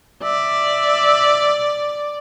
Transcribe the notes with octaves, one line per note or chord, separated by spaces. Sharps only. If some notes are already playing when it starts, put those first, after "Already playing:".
D5 E5